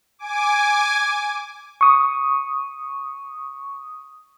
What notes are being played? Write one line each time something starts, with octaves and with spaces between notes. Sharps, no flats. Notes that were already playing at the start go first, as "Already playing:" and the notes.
G#5 D6
C#6 D#6